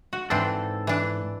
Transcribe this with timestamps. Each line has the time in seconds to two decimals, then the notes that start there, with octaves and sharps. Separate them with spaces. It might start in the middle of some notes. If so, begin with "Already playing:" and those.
0.13 F#4
0.30 G#2 E3 C4 D4 A4
0.87 E3 D4